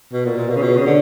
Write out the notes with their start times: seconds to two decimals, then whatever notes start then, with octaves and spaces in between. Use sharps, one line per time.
0.13 B2
0.26 A#2
0.38 A#2
0.50 B2
0.56 C#3
0.62 B2
0.76 C#3
0.86 D3